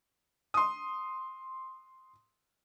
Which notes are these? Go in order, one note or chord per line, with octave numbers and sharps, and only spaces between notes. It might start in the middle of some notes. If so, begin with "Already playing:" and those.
C6 D#6